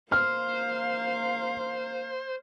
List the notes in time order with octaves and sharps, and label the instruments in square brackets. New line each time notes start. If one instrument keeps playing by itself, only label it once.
[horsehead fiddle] A#3 F5 [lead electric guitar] C5 [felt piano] F6